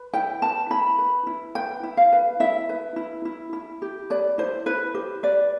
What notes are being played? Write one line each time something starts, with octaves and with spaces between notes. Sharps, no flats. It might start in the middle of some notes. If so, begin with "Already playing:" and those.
Already playing: B4
E4 G5
B4 A5
E4 B5
B4
E4
B4 G5
E4
F5
B4
E4 E5
B4
E4
E4
E4
G4
B4 D5
E4 C5
E4 B4
G4 C5
B4 D5